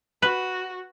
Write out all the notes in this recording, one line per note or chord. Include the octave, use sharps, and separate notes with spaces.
F#4 B4